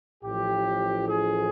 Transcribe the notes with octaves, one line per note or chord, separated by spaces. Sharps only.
A1 A2 F3 G4
G#4